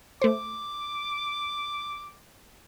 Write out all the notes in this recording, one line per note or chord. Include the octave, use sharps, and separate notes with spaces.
A3 C5 D6